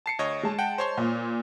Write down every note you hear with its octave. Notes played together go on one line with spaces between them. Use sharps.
A5 C7 C#7
D2 C#5 D#5
G#3 A5
F#5 G5
C5 C#5 C6
A#2